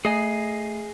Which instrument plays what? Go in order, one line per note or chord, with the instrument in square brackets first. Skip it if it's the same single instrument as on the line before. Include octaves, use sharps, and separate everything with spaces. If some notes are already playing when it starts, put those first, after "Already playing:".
[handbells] A3 C7 [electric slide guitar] G#4 D#5 G#5